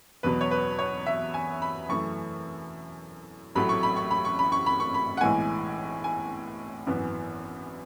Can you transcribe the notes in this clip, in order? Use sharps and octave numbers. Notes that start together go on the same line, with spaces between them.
E2 B2 F#3 B3 B4
C#5
B4
C#5
E5
G#5
B5
F#2 E3 A3 C#6
A1 A2 F#3 A3 B5
C#6
B5
C#6
B5
C#6
B5
C#6
B5
C#6
B5
F#5
B1 A2 E3 G#3 G#5
G#5
G#1 F#2 E3 B3